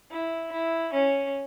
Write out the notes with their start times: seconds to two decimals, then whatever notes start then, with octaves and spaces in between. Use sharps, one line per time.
0.11 E4
0.52 E4
0.93 C#4